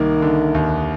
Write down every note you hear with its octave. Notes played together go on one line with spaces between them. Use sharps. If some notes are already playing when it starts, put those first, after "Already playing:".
Already playing: C2 D#3 A#3
D3
D#2